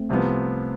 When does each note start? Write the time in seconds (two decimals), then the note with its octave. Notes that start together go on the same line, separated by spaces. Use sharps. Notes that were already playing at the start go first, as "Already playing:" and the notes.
Already playing: A3 C4
0.09 C2 C3 F3 B3